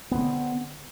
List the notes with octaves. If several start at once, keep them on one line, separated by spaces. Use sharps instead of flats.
D3 B3 C4